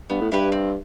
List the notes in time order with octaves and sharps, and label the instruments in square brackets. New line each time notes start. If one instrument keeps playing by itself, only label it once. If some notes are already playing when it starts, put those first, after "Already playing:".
[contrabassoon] G2 [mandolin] B3
[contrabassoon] A2
[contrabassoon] G2 [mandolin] E4 G4 B4
[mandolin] C4